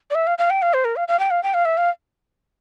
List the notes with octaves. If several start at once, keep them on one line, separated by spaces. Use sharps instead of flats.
D5
E5
F5
F5
G5
F5
C5
A#4
F5
F5
G5
F5
G5
F5
E5
F5